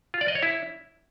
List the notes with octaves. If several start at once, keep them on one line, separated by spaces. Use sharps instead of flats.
F4
D5
D#5
C#5
E4